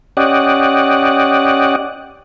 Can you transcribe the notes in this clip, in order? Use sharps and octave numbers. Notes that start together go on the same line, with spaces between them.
C#4 G4 D5 D#5 F#5